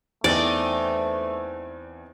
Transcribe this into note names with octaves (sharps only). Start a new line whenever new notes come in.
E2 A3 C4 D#4 D5 A6